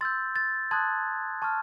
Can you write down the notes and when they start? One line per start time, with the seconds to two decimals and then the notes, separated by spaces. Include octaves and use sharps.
0.01 C6 E6 G6 A6
0.36 A6
0.71 A5 C6 D#6 F#6 G#6
1.42 A5 C#6 F6